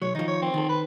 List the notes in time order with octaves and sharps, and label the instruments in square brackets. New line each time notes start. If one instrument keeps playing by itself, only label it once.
[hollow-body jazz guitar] B1 F#3 [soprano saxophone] C#5
[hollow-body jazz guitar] D#3 F3 [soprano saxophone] D#4
[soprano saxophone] C#5
C4
[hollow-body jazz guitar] D#3 A4
[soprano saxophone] B4